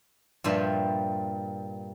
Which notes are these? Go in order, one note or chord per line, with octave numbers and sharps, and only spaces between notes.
G2 A#2 F3 G3 C5 E5